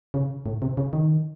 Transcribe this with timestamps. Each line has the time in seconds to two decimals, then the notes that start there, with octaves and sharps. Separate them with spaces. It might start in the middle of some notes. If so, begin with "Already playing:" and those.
0.14 C#3
0.46 A2
0.62 C3
0.77 C#3
0.93 D#3